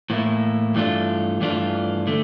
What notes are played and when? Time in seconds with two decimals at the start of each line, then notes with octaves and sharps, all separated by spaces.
0.10 A2 E3 A#3 E4
0.75 G2 E3 A3 D4 F4
1.40 G2 E3 A3 D4 F4
2.07 D3 A3